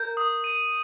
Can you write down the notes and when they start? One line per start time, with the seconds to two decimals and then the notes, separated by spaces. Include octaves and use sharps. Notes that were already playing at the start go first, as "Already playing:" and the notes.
Already playing: A#4 G6
0.17 D#6
0.44 D#7